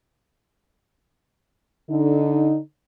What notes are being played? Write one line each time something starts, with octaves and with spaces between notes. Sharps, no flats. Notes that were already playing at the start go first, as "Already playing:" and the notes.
D3 D#4